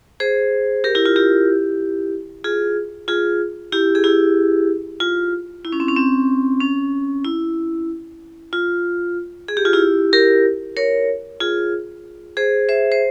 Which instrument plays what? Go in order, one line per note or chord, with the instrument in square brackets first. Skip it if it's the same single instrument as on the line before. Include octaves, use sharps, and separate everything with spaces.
[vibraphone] G#4 C5
G4 A#4
E4 G4
F4
E4 G4
F4 G#4
F4 G#4
E4 G4
G#4
E4 G4
F4
E4
C#4
C4
C#4
C4
C#4
E4
F4
G#4
G4
F4
E4 G4
G4 A#4
A#4 C#5
F4 G#4
G#4 C5
C5 E5
C5